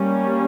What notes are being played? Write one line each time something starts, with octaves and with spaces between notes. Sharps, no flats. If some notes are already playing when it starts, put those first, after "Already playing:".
Already playing: G3 A#3 C#4